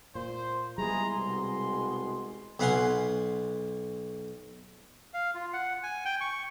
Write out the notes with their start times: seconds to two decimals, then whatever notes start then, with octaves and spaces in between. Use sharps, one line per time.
0.15 A#2 C5
0.78 G3 G#3 B3 E4 G#4 A#5 C6
1.15 C2 B2 G#3 G#4
2.60 B1 B4 F5 F#5 G#5 C6
5.14 F5
5.34 F4
5.53 F#5
5.83 G#5
6.05 G5
6.21 C#6